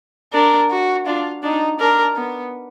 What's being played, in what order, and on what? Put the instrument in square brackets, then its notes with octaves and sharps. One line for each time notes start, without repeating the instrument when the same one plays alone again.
[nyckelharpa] D4 [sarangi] A#4
[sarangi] F#4
[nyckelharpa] D4 [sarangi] F4
[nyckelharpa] D4 [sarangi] D#4
[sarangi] D4 [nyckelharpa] A#4
[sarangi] B3